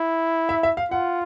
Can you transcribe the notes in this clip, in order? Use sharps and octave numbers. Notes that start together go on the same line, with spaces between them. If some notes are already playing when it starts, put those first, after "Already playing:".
Already playing: E4
E5
E5
F5
F4 F#5